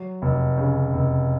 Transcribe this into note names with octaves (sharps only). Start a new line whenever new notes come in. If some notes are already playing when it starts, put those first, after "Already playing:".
Already playing: F#3
F1
C#3
F1